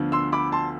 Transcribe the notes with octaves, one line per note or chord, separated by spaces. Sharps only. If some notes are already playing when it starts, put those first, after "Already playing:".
Already playing: D2 D3 F3 B3
C6 E6
B5 D6
A5 C6